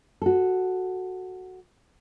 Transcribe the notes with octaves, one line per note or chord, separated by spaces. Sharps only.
F#4 A4